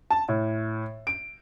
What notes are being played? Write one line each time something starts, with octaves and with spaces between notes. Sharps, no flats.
A5
A2
D7